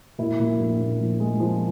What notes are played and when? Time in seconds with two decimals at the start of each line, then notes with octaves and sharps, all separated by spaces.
0.18 A#2 E4
0.40 A#2
0.60 A#1
0.80 A#2
1.00 F3
1.20 G#3
1.40 F3